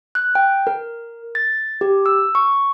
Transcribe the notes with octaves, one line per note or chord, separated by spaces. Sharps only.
F#6
G5
A#4
A6
G4
E6
C#6